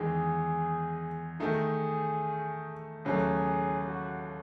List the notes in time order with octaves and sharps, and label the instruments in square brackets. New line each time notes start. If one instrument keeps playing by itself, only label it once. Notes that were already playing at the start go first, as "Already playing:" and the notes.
Already playing: [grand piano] E2 D#3 G#3 [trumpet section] G#4
[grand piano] D#3 A3 D#4 [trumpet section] G#4
[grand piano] D#2 C#3 F#3 A3 [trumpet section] G#4
[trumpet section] F#4